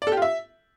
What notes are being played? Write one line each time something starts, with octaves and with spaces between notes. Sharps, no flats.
D5
A4
G4
F4
E5